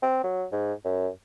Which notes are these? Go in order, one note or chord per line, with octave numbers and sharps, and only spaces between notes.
C4
F#3
G#2
F#2